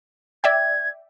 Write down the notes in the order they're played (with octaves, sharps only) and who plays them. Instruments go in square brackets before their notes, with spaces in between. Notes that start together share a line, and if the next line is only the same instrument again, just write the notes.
[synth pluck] D5 E5 G5 [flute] G#6